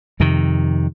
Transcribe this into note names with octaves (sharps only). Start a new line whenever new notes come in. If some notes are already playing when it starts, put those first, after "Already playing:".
F2 C3 D#3